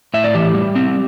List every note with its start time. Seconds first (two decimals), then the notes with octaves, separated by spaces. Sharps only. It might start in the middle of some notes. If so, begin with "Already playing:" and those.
0.14 A2 E5
0.24 D5
0.35 E3 G4
0.55 G3
0.75 C4